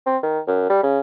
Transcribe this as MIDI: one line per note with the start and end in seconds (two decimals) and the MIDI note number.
0.06 0.17 60
0.23 0.39 51
0.47 0.68 42
0.70 0.78 55
0.83 1.00 49